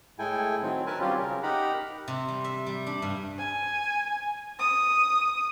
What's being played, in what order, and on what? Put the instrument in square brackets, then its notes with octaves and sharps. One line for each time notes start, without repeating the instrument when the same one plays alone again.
[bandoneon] A2 G#3 E4 A4 G5 G#5
D#3 F#3 C4
A#4 B4 G#5 A5
F#3 G3 C4 C#4 F4 G4
C#3 A#4
D#4 G4 A#4 F#5 A#5 B5
[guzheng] C3
G3
E5
G3
D4
G2
[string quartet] G#5
D#6